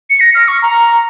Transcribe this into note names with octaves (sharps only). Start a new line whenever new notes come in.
C#7
A#6
F6
C#6
A#5